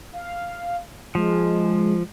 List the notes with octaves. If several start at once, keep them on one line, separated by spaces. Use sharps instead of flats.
F5
F3 G#3